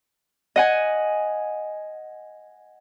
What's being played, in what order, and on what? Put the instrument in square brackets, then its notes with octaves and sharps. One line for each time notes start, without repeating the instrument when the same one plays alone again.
[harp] D#5 F#5 G#5